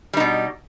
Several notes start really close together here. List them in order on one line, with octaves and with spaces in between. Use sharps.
G3 D#4 B2